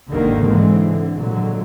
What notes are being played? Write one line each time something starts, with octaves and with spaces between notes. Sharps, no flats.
G#1 D#2 D3 D#3 A#3
G#2 D3 E3 G#3 C4
D3
A#2 D3 F3 F#3 G#3